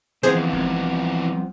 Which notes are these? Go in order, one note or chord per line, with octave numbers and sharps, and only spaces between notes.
D#2 E3 F3 B3 C4 G#4 C5
G#1 E3 G3